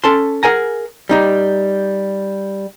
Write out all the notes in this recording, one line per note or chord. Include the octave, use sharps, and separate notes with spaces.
C#4 A4 A5 C6
G#4 A#4 F#5 G#5 A#5
G3 D#4 G4